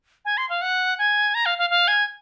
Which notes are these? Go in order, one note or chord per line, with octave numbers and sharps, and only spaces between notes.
G#5
C6
F5
F#5
G#5
A#5
F5
F5
F5
G#5